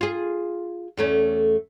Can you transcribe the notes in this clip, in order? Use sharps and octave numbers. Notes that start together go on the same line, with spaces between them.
F4 G#4
E2 A3 C#4